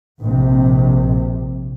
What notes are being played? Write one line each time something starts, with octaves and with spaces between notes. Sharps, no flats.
A#1 C3